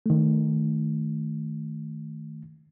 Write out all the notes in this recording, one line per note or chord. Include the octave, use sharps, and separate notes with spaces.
D#3 A3